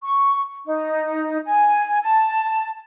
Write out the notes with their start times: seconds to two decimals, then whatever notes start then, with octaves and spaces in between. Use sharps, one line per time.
0.03 C#6
0.65 D#4
1.46 G#5
2.02 A5